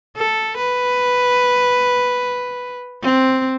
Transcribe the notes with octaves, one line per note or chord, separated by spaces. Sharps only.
A4
B4
C4